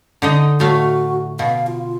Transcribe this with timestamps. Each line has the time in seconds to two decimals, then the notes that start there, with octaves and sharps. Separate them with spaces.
0.22 D3 D#4 D#5
0.60 A2 A3 F#4 F5
1.39 B2 F5
1.67 F4